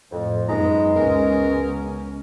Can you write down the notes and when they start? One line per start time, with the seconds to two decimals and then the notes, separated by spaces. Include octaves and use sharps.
0.12 F2 A2
0.48 F#2 G#3 B3 D#4 A#5
0.96 C#2 B3 C#4 A#4